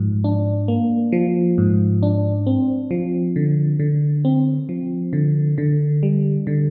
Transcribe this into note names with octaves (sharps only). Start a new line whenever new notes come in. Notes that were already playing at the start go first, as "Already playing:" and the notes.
Already playing: G#2 F3
D4
A#3
F3
G#2
D4
C4
F3
D3
D3
C4
F3
D3
D3
G3
D3